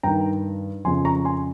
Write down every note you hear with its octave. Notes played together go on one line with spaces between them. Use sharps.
G2 D#3 G5 A#5
F2 C#3 F3 G#5 C6
A#5 C#6
G#5 C6